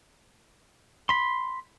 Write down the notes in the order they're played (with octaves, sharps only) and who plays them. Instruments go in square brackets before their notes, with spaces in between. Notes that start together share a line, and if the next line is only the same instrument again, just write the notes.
[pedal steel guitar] B5 C6